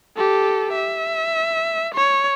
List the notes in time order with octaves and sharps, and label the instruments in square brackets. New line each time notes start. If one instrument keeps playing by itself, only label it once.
[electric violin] G4 A4
E5
C#5